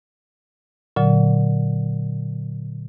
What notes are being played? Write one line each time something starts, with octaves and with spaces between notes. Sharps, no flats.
A#2 D3 F#3